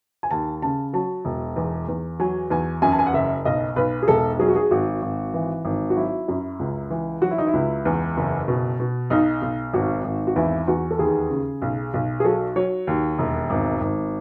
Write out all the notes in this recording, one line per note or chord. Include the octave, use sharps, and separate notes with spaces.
G#5
D#2 A5
C#3 A5
F#3 A5
E1
E2
E2
F#3 G#5
E2 G#5
F#2 G#5
A5
G#5
F#5
F#1 E5
B1 D#5
B1 B4
G#4
E1 A4
F#3 G#4
F#4
G#4
G#1 F#4
G#1
E3
G#1
F#4
F#3 E4
F#2
C#2
E3
F#3 F#4
E4
D#4
E4
C#2
E2
F#1
B2
B2
B1 D#4
B1
G#1 F#4
G#1
F#4
E2 E4
E2 F#4
A4
D#2 G#4
C#3
B1
B1
G#4
F#3 A4
F#3 C#5
D#2
E1
G#1
G#1